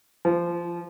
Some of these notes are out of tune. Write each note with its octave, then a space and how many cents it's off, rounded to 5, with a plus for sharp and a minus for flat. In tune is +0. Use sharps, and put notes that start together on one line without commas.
F3 -20